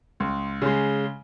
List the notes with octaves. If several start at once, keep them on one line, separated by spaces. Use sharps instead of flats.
C#2
C#3 G#3